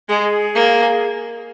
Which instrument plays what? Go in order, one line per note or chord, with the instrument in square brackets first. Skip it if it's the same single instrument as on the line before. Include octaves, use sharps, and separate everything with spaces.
[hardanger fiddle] G#3 [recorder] G#4
[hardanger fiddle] A#3